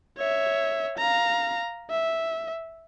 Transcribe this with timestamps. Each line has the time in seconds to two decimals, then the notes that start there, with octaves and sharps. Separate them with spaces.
0.17 C#5 E5
0.98 F5 A#5
1.91 E5